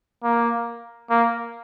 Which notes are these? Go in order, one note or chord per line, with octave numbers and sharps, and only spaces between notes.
A#3
A#3